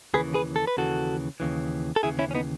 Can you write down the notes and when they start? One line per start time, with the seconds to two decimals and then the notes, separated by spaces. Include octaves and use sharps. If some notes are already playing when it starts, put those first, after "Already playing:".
0.14 D#2 C#3 E3 G#4 B4
0.34 G#4 B4
0.56 A4
0.67 B4
0.77 D#2 C#3 E3 F#4 A4
1.40 D#2 C#3 E3
1.96 A4
2.03 D#2 C#3 E3 E4 G#4
2.19 C#4 E4
2.31 C#4
2.35 B3 D#4